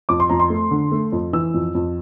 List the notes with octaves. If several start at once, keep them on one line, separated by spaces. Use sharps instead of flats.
F2 D6
C6
F2 A#5
C6
A3
D3
A3
F2
E3 E6
F2
F2